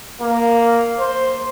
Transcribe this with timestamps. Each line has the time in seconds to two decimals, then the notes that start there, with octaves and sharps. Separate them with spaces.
0.21 A#3
0.99 C5